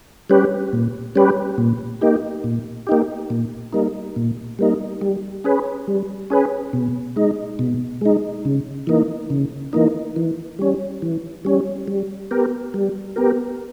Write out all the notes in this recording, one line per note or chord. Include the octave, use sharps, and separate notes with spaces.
G3 C#4 G4 B4
A#2
G3 C#4 G4 B4
A#2
A#3 D#4 G4
A#2
A#3 D#4 G4
A#2
G3 A#3 D#4
A#2
G3 A#3 D#4
G3
C#4 G#4 B4
G3
C#4 G#4 B4
B2
G#3 D#4
B2
G#3 D#4
C#3
E3 A#3 D#4
C#3
E3 A#3 D#4
E3
G3 C#4
E3
G3 C#4
G3
B3 G4 A#4
G3
B3 G4 A#4